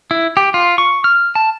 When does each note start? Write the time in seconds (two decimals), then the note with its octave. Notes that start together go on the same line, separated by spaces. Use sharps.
0.11 E4
0.37 G4
0.54 F4
0.78 C#6
1.04 F6
1.35 A5